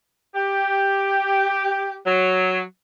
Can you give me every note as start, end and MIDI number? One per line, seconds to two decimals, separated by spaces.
0.35 1.94 67
2.06 2.60 54